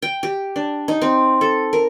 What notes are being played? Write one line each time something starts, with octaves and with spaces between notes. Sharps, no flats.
G5
G4
D4
D#4
C4
A4
A#4